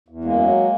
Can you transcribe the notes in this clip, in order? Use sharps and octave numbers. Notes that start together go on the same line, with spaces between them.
E2
F#2 G#3 A#3
F#3